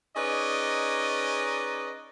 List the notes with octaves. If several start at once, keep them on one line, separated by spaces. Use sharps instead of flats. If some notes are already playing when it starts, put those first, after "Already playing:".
C#4 D#4 G#4 B4 D5 D#5